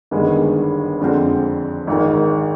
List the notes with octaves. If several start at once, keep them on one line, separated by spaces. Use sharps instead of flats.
G1 G2 D#3 G#3 B3
F2 D3 G#3 C4
G#1 G#2 D#3